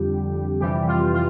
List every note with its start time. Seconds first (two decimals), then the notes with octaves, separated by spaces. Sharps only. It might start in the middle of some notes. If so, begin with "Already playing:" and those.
Already playing: F2 D3 G3 G4
0.60 F2 C3 E3 G3 G4
0.88 F4
1.14 F4